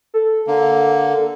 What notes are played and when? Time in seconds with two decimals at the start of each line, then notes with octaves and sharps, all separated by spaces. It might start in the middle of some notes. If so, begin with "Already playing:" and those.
0.14 A4
0.47 D3 A#3